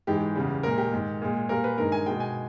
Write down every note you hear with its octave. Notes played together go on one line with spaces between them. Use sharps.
G#2 E3 G#3 G4
E2 C#3 G3
A#2 G#3 A#4
G4
G#2 D#3 G#3
A#2 G#3
A#2 G3 A#3 A#4
B4
G2 D#3 G#3 A#4
G#5
B2 G#3 G5
G#5